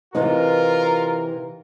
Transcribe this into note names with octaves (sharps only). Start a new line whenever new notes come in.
C3 E3 D#4 F4 A#4